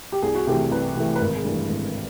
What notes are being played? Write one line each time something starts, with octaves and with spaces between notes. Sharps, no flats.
G4
C2 G#4
F#4
C3 E3 A3 G4
C2 B4
C3 E3 A3
B4
G#1 A#4
G#4
G2 E3 A3
G#1